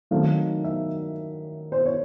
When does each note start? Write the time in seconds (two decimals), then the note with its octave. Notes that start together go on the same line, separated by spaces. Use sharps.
0.11 D#3 F#3 A3 C4 D#4 F5
0.64 E5
1.72 C5
1.85 C#5